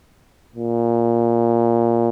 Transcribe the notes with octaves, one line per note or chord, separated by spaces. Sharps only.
A#2